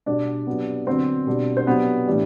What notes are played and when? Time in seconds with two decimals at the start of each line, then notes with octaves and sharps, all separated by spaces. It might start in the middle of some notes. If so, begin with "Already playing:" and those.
0.06 B2 G3 D4 D5
0.47 C3 F#3 B3
0.86 D3 F#3 B3 C4 D4 C5
1.27 B2 G3 B3 D4
1.57 C5
1.66 C3 F#3 B3 D4 B4
2.07 A2 E3 G3 D4